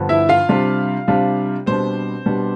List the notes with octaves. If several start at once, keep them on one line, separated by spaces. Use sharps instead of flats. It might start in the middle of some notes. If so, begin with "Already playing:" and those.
Already playing: G2 D3 F3 B3
E4 E5
F4 F5
C3 G3 D4 F4
C3 G3 D4 F4
B2 G3 B3 C4 D4 C5
B2 G3 B3 D4